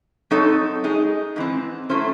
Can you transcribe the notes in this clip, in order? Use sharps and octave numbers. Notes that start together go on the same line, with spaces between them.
F#3 C4 D#4 A4 C#5
G#3 D#4 G#4
G#2 E3 C4
F#3 A3 C#4 E4 C5